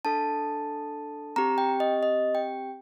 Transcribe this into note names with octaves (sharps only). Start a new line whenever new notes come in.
D4 A4 A5
C4 G4 A#5
G5
D#5
D#5
G5